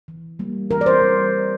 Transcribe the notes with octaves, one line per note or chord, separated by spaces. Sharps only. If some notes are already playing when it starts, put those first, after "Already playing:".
E3
G3 A#3
E3 A#4
D5
C5
G3